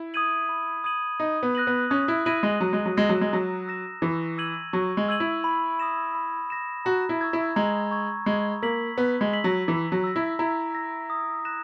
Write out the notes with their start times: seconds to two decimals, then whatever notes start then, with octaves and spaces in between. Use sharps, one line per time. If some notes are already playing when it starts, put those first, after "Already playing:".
Already playing: E4
0.14 D#6 G#6 D#7 F#7
0.49 B5
0.84 D#6 G#6 D#7 F#7
1.20 D#4 D#6
1.43 B3
1.55 F#6 A#6 D#7 F#7
1.67 B3
1.90 C#4 D#6
2.08 E4
2.26 E4 F#6 A#6 D#7 F#7
2.43 G#3
2.61 F#3 A#5
2.73 G#3
2.86 F#3
2.96 G#3 E6 A#6 E7
3.09 F#3
3.21 G#3
3.32 F#3 A#5
3.68 E6 A#6 E7
4.02 E3 C#6
4.38 E6 G#6 D#7 F#7
4.73 F#3 C#6
4.97 G#3
5.09 E6 G#6 D#7 F#7
5.20 E4
5.44 B5
5.80 D#6 A#6 E7
6.15 B5
6.50 D#6 A#6 E7
6.85 F#4 A#5
7.09 E4
7.21 C#6 E6 G#6
7.33 E4
7.56 G#3 A#5
7.91 C#6 E6 G#6
8.26 G#3 B5
8.62 A#3 E6 B6 F#7
8.98 B3 B5
9.21 G#3
9.33 E6 B6 F#7
9.44 F#3
9.68 E3 A#5
9.92 F#3
10.04 E6 A#6
10.16 E4
10.39 E4 A#5
10.74 E6 A#6
11.10 D#6
11.45 F#6 A#6 E7